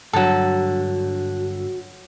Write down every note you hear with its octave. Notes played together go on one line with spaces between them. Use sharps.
G2 D3 F#3 F#4 A4